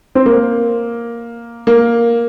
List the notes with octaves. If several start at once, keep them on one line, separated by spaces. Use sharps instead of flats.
C4
A#3
A#3